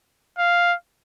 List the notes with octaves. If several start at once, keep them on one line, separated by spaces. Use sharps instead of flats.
F5